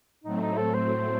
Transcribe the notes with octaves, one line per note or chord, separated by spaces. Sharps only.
A2 F#3 A3 C4 D#4
D#4
A4
C5